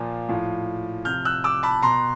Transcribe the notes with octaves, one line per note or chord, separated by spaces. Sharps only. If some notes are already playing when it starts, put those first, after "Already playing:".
Already playing: A#2 F3
A2 F3
C3 F3 F6 G6
E6 F#6
D6 E6
A5 B5
B2 A#5 C6